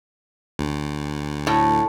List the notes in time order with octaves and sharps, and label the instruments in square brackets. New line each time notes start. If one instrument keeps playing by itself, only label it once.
[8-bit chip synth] D2
[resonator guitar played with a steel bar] A2